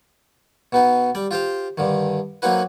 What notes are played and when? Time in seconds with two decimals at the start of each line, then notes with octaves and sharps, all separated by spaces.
0.72 B2 B3 D#4
1.15 G3 D5
1.31 F4 G4 C5 F5
1.78 G2 D3 D#3
2.42 F#3 A#3 C4 D#4 F#4 B4